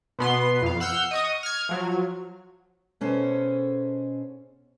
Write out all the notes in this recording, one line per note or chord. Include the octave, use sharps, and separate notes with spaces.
B2 B3 C6
F2 F5
F#5 E6 F6 G6
D#5 C#6 D#6
F6 G#6
F3 F#3
B2 C#4 G#4 A4 C5